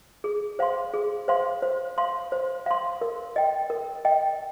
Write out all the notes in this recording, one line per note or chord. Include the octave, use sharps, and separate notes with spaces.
G#4
C5 F5 C6
G#4
C5 F5 C6
C5
F5 C6
C5
F5 C6
A#4
D#5 G5
A#4
D#5 G5